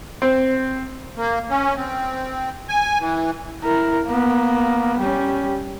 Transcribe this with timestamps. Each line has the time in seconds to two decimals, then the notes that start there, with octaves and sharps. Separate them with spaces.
0.22 C4
1.17 A#3
1.50 C#4
1.77 C4
2.69 G#5
3.00 E3
3.62 E4 A#4
4.06 A#3 B3
5.00 G3 C#4